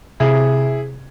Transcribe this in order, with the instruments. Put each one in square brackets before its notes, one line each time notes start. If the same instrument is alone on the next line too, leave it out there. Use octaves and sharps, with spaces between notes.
[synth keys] C3 [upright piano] E4 G#4